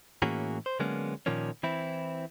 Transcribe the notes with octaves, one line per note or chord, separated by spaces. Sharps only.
A2 E3 A#3 C#4 F#4 G#4
C5
D3 F#3 G#3 A#3 B3 C#4
A#2 D#3 F3 A#3 C#4
E3 C4 E4